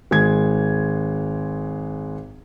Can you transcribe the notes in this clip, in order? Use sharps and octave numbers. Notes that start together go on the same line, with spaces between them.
G#1 G#3 G#6